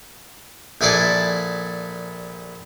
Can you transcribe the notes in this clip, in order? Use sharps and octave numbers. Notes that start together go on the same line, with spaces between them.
A#1 E4 G#4 A4 D5 E5